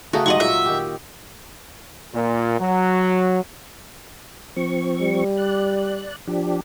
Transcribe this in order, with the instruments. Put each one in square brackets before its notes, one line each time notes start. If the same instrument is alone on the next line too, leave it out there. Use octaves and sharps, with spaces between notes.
[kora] C#3 A3 D#4 [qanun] F#4
[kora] G#2 F#3 G3 [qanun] D#5 F#5 C#6
[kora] A#2 F#3 [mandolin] E5
[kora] D#3 G4
[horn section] A#2
F#3
[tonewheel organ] F3 C4 C#6
[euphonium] G3
[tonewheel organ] D5 F#6
F3 D4 G4